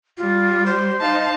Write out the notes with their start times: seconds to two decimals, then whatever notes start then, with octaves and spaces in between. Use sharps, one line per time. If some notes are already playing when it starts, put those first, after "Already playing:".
0.18 G3 F4
0.66 C5
1.00 D#4 F5 A5